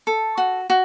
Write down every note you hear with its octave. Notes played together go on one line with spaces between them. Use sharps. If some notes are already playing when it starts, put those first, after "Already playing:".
A4
F#4
F#4